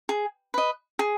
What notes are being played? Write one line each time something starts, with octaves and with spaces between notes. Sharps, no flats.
G#4
B4 D#5
G#4